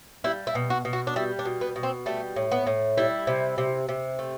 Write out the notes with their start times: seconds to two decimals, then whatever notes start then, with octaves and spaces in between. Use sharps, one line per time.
0.24 G3 E4
0.47 E4
0.55 B2
0.70 F#4
0.85 B2
0.93 F#4
1.07 D4
1.16 G3 E4
1.39 D4
1.45 B2
1.61 B3
1.76 B2
1.83 C4
2.06 G3 A3
2.36 A2
2.52 B3
2.67 A2
2.98 G3 E4
3.27 C3
3.58 C3
3.89 C3
4.19 A3